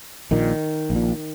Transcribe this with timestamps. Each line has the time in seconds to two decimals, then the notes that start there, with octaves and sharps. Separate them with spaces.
0.31 A#1 A#2 D#3
0.90 A#1
0.96 A#2